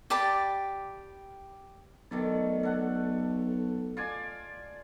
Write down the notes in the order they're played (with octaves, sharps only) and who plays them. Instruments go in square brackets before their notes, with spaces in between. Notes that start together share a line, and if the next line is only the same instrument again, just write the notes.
[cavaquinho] G4 D5 A5 B5
[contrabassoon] B1 [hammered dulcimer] D#3 A3 D5
[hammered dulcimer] A3 F#5
F4 D5 G#5